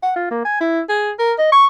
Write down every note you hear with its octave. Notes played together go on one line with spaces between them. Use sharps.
F#5
F4
A#3
G#5
E4
G#4
A#4
D#5
C#6